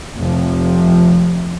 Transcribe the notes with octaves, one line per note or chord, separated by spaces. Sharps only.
F1 C3 F3